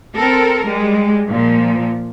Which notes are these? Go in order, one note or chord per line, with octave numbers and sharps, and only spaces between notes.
C4 A4 A#4
G3 G#3
A#2 F3